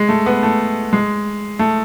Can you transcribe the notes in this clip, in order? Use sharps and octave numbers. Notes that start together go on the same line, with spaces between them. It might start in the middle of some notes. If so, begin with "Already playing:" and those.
Already playing: G#3
A3
B3
A3
G#3
A3